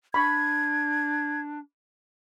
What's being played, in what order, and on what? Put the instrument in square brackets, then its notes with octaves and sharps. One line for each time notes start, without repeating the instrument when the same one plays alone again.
[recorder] D4 [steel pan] B5 C#6 [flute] G#6